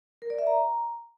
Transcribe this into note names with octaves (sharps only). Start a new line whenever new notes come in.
A#4
D5
E5
A#5